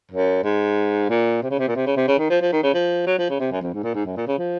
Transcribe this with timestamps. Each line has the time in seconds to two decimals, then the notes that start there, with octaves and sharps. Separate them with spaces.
0.11 F#2
0.44 G#2
1.10 A#2
1.43 C3
1.50 C#3
1.59 C3
1.68 A#2
1.76 C3
1.86 C#3
1.97 C3
2.08 C#3
2.19 D#3
2.30 F3
2.41 F3
2.52 D#3
2.63 C#3
2.74 F3
3.06 F#3
3.18 F3
3.29 C#3
3.40 C3
3.51 F#2
3.61 F2
3.73 G#2
3.83 A#2
3.94 G#2
4.05 F#2
4.17 A#2
4.27 C#3
4.38 F3